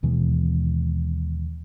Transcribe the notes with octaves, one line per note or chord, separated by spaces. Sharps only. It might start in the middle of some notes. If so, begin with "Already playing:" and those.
D#2 B2 E3 G#3